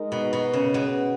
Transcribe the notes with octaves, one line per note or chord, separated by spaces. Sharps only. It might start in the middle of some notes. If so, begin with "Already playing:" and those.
Already playing: G#3 D#4 A#4 D#5
B2
B2
C#3
B2